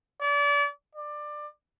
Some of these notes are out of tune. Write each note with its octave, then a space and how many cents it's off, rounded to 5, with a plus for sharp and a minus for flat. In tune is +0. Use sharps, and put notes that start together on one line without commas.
D5 -35
D5 +20